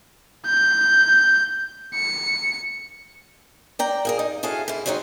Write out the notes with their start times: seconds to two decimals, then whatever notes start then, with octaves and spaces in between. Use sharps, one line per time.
0.46 G6
1.94 C#7
3.79 D5 G5 A#5
4.05 A#3 G#4 A#4
4.19 D#4
4.43 E4 F#4 G#4 A4 F5
4.68 G#2 E4
4.86 F#3 G#3 C4 C#4 D#4